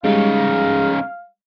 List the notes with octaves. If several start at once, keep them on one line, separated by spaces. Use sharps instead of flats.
C#3 G3 G#3 D#4 G#4 F5